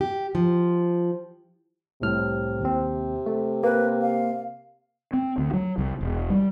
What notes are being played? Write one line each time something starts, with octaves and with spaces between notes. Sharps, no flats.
G4
F3
C2 A2 C3 F6
D#2 C4
A3
A#3 B4
F5
C4
D2
F#3
C2
E1
G3